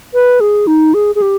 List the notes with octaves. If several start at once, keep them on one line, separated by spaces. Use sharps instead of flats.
B4
G#4
D#4
G#4
G#4
G4